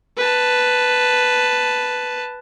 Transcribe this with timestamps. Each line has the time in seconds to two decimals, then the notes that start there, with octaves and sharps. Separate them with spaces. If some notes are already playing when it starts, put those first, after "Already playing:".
0.17 B4 A5